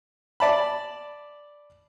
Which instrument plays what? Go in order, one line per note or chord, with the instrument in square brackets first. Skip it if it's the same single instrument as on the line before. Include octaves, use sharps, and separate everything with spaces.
[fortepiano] D5 A5 B5